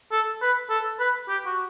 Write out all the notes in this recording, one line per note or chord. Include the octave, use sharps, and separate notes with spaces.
A4
B4
A4
B4
G4
F#4